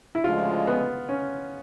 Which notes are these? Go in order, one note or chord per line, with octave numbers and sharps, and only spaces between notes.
E4
D2 C#3 F3 G#3 F4
B3
C#4